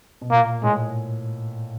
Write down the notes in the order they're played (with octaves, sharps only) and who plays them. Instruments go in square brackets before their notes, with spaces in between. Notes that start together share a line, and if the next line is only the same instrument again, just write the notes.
[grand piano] B2
[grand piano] A#2 [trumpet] A#3
[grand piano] A2 [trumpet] G#3